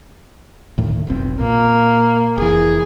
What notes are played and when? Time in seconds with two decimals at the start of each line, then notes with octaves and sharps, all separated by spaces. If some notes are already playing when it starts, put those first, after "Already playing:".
0.78 D2 A2 D#3
1.07 F1 B1 C4
1.41 A#2 A#3
2.38 F1 E3 G#4